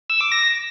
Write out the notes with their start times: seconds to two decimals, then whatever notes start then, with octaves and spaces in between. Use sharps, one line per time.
0.10 E6
0.21 D6
0.32 A#6